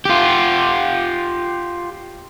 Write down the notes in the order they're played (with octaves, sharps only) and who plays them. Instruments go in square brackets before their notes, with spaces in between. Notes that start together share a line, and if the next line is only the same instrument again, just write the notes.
[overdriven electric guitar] F4 G4